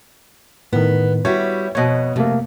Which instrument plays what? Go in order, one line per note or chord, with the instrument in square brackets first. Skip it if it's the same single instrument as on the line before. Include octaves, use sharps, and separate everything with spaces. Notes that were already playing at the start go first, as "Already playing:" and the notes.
[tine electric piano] A2 D#3 [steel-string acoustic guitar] B3
[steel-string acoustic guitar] G3 E4 F#4 [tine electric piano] C#5
[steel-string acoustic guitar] F2 B2 [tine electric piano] C#5 D#5
[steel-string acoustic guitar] F2 [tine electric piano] C3 A3 A#3